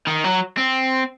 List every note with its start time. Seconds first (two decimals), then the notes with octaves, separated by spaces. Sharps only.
0.07 D#3
0.24 F#3
0.57 C4